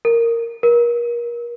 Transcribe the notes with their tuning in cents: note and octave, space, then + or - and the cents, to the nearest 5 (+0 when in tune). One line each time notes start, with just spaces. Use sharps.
A#4 -10
A#4 +30